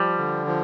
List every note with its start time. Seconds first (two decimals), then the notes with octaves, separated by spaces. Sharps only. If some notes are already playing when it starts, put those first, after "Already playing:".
Already playing: F3 G3
0.18 D3
0.47 F3